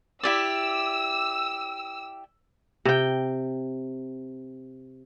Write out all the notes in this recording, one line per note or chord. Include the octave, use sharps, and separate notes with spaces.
E4 G4 D5 E6
C3 G5